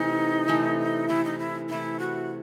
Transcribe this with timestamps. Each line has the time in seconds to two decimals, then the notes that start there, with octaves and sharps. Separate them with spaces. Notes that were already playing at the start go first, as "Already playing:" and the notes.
Already playing: C3 E3 A3 D#4
0.48 C3 E3 A3
1.08 C3 E3 A3 E4
1.25 D#4
1.39 E4
1.69 C3 E3 A3 E4
1.99 F#4